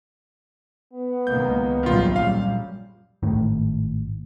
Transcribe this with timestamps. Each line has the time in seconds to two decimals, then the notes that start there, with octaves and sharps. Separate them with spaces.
0.93 B3
1.27 C#2 D#3 A#3 G6
1.83 A#1 F#2 D#3 G3 F4
2.16 F5
3.23 G#1 A2 D#3